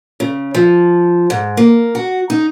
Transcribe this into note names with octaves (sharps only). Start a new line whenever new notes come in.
C#3
F3
G#2
A#3
F#4
D#4